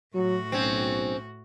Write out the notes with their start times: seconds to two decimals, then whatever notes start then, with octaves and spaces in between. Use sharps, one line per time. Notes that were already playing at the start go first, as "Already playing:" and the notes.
0.14 A2 F#3 F#4
0.52 B1 C4 C#4